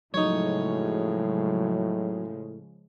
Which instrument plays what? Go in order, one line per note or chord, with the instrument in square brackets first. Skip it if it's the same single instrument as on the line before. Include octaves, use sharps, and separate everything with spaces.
[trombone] A2 [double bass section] C#3 F3 G#3 [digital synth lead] F#3 [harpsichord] D#4 C#5